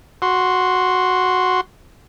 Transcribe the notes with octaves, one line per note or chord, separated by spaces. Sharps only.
F#4 C6